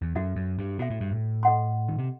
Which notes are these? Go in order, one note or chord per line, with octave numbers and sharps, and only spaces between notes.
E2
F#2 F#4 A4 E5
F#2
G2
B2 F#4 A4 E5
A2
G2
A2
A4 D#5 F#5 C6
D#3
C3